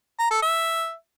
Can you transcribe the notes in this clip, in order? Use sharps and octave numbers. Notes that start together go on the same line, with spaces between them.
A#5
A4
E5